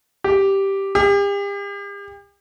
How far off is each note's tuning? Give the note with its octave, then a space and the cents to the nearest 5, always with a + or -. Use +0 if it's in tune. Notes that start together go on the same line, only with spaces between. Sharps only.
G4 -5
G4 +40